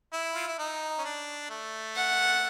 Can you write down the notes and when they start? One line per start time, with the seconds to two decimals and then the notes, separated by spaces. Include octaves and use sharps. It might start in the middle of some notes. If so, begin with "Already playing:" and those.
0.13 E4
0.34 F4
0.47 E4
0.58 D#4
0.99 C#4
1.04 D4
1.50 A3
1.95 F#5